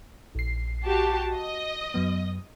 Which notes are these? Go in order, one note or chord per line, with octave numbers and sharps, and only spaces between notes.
A#1 C7
F#4 G4 A5
D#5
F#2 F#3 B3